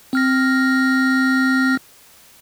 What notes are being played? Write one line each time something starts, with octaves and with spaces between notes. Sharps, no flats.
C4 F6 A#6